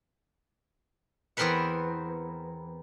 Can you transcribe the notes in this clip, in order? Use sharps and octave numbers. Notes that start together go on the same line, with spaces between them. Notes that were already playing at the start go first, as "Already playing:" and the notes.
E2 B3 C4 A#4 B4 F#5